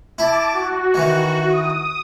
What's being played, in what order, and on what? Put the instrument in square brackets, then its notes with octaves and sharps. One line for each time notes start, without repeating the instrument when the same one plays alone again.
[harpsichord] E4 [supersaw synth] A5 D6
[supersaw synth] F#4
[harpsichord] D#3 E3
[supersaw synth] D#6